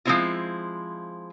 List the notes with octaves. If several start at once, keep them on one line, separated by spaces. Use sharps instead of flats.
F3 G#3 A#3 C4 E4 F4